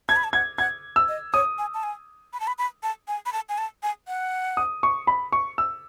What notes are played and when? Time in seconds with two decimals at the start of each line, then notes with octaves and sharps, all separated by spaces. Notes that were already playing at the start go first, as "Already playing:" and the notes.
0.09 A5 G#6
0.16 B5
0.24 A5
0.33 F#5 G#6
0.58 F#5 G#6
0.96 E6
1.08 D#5
1.33 C#5 D#6
1.58 G#5
1.74 A5
1.83 G#5
2.33 B5
2.40 A5
2.47 B5
2.58 B5
2.83 A5
3.08 G#5
3.26 B5
3.33 A5
3.49 G#5
3.58 A5
3.83 G#5
4.08 F#5
4.57 D#6
4.83 C#6
5.07 B5
5.32 C#6
5.58 E6